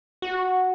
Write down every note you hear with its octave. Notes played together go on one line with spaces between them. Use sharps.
F#4